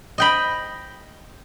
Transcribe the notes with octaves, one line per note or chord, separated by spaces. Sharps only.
D#5 G5 B5